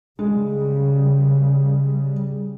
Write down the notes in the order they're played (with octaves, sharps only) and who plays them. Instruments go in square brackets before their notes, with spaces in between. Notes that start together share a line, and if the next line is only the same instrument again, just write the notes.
[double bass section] C#3 G3 [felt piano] G#3